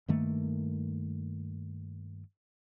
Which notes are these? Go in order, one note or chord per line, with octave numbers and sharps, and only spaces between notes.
G2 D#3 A3 A#3